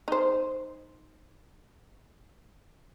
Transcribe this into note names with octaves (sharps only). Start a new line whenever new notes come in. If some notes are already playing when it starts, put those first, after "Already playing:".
D#4 C5